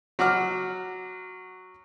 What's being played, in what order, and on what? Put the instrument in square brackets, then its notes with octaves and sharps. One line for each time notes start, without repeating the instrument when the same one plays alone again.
[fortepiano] F#3 F#5 D6 F6